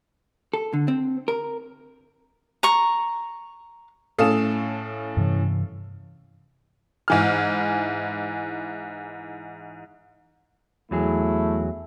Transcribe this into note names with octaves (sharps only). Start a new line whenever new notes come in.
A4
D3
C4
A#4
A#5 C#6
A2 C#4 A4 F5 D#6 E7
G2 C3 E3
G#2 E3 F6
E2 F#3 A3 E4 G#4